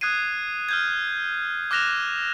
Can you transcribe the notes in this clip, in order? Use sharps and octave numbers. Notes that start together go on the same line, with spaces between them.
D#6 F#6 G#6 C7 D#7
F6 G6 G#6
D6 F6 F#6 A#6 E7 F7